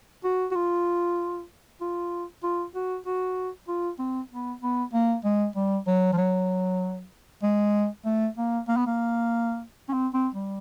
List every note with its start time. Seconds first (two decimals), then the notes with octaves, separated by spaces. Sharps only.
0.24 F#4
0.51 F#4
0.55 F4
1.81 F4
2.43 F4
2.75 F#4
3.06 F#4
3.68 F4
3.99 C4
4.31 B3
4.62 B3
4.93 A#3
5.24 G#3
5.56 G3
5.87 F#3
6.12 F3
6.17 F#3
7.43 G#3
8.05 A3
8.37 A#3
8.68 A#3
8.76 B3
8.87 A#3
9.88 C#4
9.93 C4
10.14 C4
10.35 G3